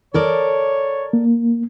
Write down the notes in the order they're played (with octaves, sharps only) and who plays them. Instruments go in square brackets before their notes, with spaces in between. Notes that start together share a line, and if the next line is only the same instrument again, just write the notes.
[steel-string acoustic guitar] A4 A#4 D5 [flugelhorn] C#5
[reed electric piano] A#3